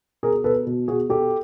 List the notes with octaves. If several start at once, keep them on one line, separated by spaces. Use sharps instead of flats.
B2 G#4 A#4
B2 A4 B4
B2
B2 F#4 G#4
B2 G4 A4